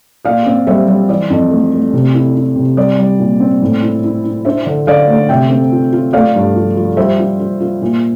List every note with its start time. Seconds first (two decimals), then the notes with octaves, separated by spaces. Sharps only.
0.25 A#2 D5 F5
0.46 C4
0.67 G3 C5 E5
0.88 G3
1.09 E3 D5
1.30 F2
1.51 A3
1.72 A3
1.93 C3
2.14 E4
2.35 E4
2.56 C3
2.77 G3 D5
2.99 G3
3.19 A#2
3.40 C4
3.62 A2
3.82 E4
4.04 E4
4.24 E4
4.45 D4 C5 E5
4.66 D3
4.87 D3 D5 F5
5.08 A3
5.29 C3 E5 G5
5.50 C4
5.72 F4
5.92 F4
6.13 A3 D5 F5
6.35 G2
6.56 F3
6.77 F3
6.97 G3 C5 E5
7.19 F4
7.39 F4
7.60 F4
7.82 A#2